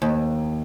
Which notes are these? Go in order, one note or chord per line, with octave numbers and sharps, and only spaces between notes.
D#2